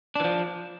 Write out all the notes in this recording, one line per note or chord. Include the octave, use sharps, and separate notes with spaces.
E3 F3 D4